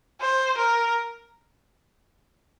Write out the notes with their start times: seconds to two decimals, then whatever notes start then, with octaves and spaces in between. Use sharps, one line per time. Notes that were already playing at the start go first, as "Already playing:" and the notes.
0.21 C5
0.58 A#4